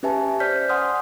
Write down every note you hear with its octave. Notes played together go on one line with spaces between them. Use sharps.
C#4 G4 B4 E5 G#5 A5
C5 D5 F6 G6 B6
F#5 G#5 C6 D#6 F6